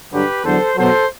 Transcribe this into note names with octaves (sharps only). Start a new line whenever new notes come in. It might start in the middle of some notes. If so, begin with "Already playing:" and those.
G2 D3 F#3 G4 B4
E2 D3 F#3 A4 C5
B2 F#3 A4 C5